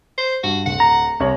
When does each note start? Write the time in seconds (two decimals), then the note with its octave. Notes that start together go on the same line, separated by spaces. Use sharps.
0.18 C5
0.44 G2 F#4
0.66 D1 F#5
0.80 A#5
1.20 C2 C#5 F#7